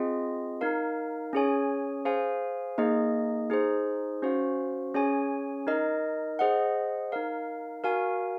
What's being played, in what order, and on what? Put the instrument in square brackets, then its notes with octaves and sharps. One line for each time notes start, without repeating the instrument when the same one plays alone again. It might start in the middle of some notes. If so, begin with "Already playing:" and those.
Already playing: [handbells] C4 F4 G#4 D#5
D#4 A#4 F5
C#4 G#4 C#5 G#5
G#4 C5 F5 G#5
A#3 D#4 G#4 D#5
D#4 G#4 C5
C#4 F#4 C5 F5
C#4 G#4 C#5 G#5
D#4 A#4 D#5
G#4 C5 D#5 F#5
D#4 A#4 F5
F#4 A#4 F5 G#5